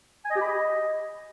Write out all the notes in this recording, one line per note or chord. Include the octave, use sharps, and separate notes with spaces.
G#5
D#5
G4
B5
D#5